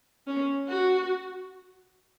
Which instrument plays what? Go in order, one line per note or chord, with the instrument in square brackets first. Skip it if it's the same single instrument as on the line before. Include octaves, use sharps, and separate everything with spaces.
[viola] C#4
F#4